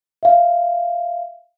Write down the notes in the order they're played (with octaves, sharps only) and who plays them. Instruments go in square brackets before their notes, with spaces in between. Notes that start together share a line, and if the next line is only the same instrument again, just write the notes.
[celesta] E5 F5